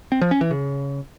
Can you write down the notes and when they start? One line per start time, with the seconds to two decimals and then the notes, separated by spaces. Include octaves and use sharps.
0.12 C4
0.21 F3
0.31 C#4
0.41 E3
0.51 C#3